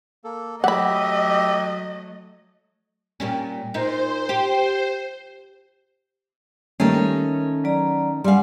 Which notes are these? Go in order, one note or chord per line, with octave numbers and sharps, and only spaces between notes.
A#3 A4
F#3 A3 G4 D#5 E5 F#5 B5
A#2 G3 C#4
A#2 D#4 C5
G4
D#3 G3 A3 A#3 C#4 G4
A4 A#4
F#3 D5 A#5
G3 F5 F#5 G#5 C6